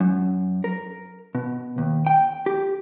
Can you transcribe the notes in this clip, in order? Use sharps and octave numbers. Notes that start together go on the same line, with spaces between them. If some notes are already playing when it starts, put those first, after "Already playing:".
F#2
A#4
B2
D#2
G5
G4